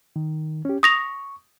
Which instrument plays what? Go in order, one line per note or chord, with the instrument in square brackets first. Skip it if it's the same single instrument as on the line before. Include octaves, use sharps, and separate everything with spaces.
[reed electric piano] D#3
C#4 G4
[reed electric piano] C#6 [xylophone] D#6 A#6 F7